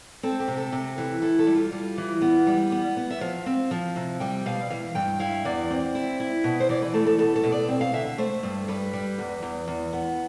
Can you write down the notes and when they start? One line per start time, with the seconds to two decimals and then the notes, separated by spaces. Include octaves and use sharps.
0.23 C4 A4
0.40 G4
0.48 C3
0.57 A4
0.72 C3
0.98 E3
1.22 E4 A4
1.39 A4
1.47 G3
1.55 F4
1.72 G3
1.98 E3
2.22 B3
2.47 G3
2.72 B3
2.97 B3
3.11 E5
3.21 F3 F5
3.46 C4
3.71 F3
3.96 C3
4.20 G3 G5
4.46 B2 F5
4.70 E3 F5
4.95 G2 G5
5.20 E4 F5
5.45 E2 D5
5.70 C4
5.95 E4
6.20 E4
6.44 B2
6.60 C5
6.69 E3 D5
6.82 B4
6.94 A3 A4
7.06 A4
7.18 B2 A4
7.36 A4
7.44 B2
7.52 D5
7.68 C4
7.81 F5
7.93 D3 E5
8.05 E5
8.18 A3 C5
8.43 G2
8.68 G3 B4
8.93 G3
9.18 E2
9.43 E2
9.68 E2
9.93 B3